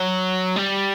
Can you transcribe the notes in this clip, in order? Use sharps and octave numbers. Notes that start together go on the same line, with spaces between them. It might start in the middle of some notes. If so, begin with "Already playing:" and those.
Already playing: F#3
G3